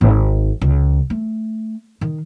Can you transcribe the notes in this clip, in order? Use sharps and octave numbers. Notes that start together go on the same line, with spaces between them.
G#1
C#2
A3
D#3